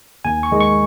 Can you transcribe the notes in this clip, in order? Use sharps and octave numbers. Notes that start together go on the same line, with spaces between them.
D#2 G#5
C#6
D#3 G#3
C#6